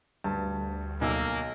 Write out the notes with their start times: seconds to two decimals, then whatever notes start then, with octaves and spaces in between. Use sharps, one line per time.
0.24 D2 G2 A5
1.01 B1 A#3 E6